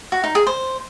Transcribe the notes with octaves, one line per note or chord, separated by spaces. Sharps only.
F#4
D#4
G#4
C5